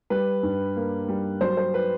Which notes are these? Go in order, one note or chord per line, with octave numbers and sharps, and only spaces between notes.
G3 B4
G2
A#3
G3
F#3 C5
C5
B4